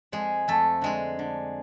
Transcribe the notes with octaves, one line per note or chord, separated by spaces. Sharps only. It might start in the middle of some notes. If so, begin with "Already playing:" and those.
F2 G#3 G#4
F2 A3 A4
D3 G#3 G#4
D3